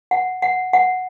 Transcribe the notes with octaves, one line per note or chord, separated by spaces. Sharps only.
F#5
F#5
F#5